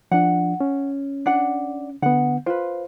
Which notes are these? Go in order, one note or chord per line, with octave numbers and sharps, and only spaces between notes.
F3 D4 F#5
C#4
D4 F#5
D3 B3 F#5
F4 B4 C5